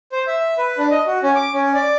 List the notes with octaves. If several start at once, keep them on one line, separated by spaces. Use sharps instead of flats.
C5
E5
B4
D4
D#5
F#4
C#4
D6
C#4
D5